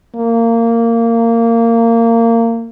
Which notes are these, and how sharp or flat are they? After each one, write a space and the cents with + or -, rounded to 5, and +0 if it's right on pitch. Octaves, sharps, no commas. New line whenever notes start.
A#3 -20